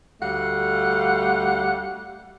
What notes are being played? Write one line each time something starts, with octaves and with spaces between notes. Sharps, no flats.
D2 G3 A3 F5 F#5